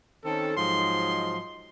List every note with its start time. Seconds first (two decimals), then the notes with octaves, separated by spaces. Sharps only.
0.25 D#3 C4 C#4 A4
0.57 G#2 F3 F#3 D#5 C6